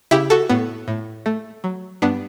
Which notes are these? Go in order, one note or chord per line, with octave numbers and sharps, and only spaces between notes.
C#3 E4 G4
F#4 A4
A2 B3
A2
A3
F#3
G2 B3 D4